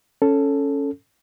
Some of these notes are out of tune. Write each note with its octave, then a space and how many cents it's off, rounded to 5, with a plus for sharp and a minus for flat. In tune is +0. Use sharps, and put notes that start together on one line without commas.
C#4 +0 A4 +0